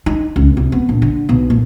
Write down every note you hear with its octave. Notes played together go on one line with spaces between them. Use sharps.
D#4
C#2
C2
B3
A#1
D3
B1
A#2